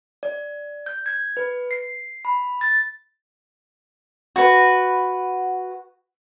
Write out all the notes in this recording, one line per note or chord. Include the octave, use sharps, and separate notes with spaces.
D5
G6
G#6
B4
C7
B5
A6
F#4 B4